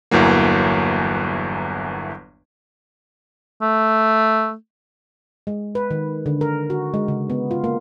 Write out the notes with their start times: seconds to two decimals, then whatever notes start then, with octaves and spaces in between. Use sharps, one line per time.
0.11 G1 E2 E3 F#3 A#3
3.62 A3
5.47 G#3
5.75 B4
5.91 D#3
6.26 D3
6.41 A#4
6.70 F#4
6.94 G#3
7.08 C#3
7.30 B3
7.51 F4
7.64 A#3